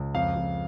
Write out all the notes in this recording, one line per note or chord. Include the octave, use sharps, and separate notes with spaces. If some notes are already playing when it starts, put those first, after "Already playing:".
Already playing: C#2
F2 F5
F2